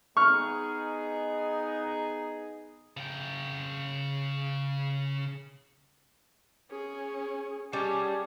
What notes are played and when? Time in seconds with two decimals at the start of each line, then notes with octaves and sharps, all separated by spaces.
0.17 B3 D#4 G#4 C#6 F6
2.97 C#3 G5
6.71 C#4 G#4
7.73 G3 C#4 G#4 A5